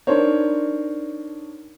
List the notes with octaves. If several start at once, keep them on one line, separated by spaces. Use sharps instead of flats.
D4 D#4 A#4 C5 C#5